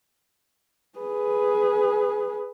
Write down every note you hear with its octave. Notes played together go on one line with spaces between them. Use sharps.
G#4 B4